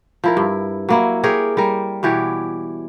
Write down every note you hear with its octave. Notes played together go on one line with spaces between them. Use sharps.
F3 E4 A#4
G2
F#3 A#3 E4
G4 G#4 A#4 C#5
G3 A#4
B2 E3 G4 C#5